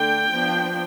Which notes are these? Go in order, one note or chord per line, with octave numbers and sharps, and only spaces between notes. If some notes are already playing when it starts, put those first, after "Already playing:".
Already playing: D3 A3 D4 G5
F3 B3 D4